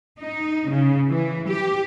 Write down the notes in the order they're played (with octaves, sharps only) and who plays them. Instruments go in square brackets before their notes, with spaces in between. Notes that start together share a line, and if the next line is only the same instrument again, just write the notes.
[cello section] D#4
C#3
E3
G4